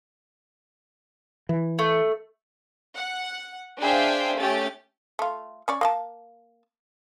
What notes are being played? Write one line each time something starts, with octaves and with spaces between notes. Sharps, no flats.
E3
A3
F#5
D4 G#4 C5 E5 F5 G5
A3 C#4 G4 A6
A3 F4
C#4 C#5 D5
A#3 D#5 A5